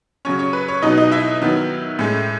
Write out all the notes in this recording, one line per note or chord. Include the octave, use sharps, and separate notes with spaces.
C#3 F#3 C#4 C#5
C#5
B4
C#5
B2 F#3 B3 D#4 D#5
D#4 D#5
E4 E5
D#3 F#3 B3
A2 G#3 C#4